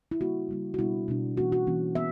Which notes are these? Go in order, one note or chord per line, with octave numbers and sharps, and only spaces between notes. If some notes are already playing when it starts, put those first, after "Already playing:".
E4
C#3 G3 A#3 F#4
C#3 G3 A#3
F#4
B2 G3 B3 D4 E4
B2 G3 B3 D4
E3 A#3 C#4 F#4
F#4
E3 A#3 C#4
B3 E5